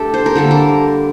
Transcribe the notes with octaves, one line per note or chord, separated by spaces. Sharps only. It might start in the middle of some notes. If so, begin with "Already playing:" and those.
Already playing: A3 D4 G4 A4
C5
A#4
D3 G3 A#3 A4
A#4